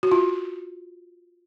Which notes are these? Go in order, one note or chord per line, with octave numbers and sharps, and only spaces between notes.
F#4
F4